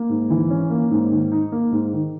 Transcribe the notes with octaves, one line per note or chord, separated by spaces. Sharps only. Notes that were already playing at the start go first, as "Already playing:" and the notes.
Already playing: A#3
G#2
E3
C#4
A#3
G#2
D#3
D#4
A#3
G#2
D#3